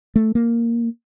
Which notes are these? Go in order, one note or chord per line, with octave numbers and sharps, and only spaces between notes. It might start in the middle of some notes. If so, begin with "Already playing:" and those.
A3
A#3